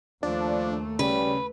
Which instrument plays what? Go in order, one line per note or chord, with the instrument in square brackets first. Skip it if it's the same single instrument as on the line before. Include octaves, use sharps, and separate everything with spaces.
[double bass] D#2 A3 [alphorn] F3 [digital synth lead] D4
[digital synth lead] C#3 [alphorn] G3 [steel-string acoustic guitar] B4